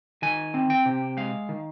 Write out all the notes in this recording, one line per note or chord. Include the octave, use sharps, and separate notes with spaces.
D#3 G#5
C4
G5
C3
G#3 F5
D#3